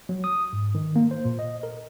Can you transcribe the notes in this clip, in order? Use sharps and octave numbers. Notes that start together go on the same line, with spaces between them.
F#3
D#6
G#2
D#3
A#3
C5
A#2
D#5
A#4